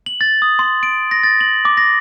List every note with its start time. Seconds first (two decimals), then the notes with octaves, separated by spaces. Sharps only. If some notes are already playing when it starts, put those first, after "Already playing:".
0.06 F#7
0.21 A6
0.42 D#6
0.59 C6
0.83 D7
1.11 A#6
1.23 A6
1.41 F#7
1.65 D6
1.77 A#6